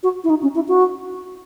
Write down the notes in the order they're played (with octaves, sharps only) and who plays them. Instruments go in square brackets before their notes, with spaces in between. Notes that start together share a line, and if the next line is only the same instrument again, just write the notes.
[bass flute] F#4
E4
D#4
C#4
E4
F#4